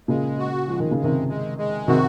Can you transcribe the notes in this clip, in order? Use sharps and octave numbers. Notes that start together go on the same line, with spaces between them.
A#2 C#3 G#3
F#4
F3 G#3
D#3
C#3
G#3
C3 D#3
G#3
G#3
C3 D#3 F#4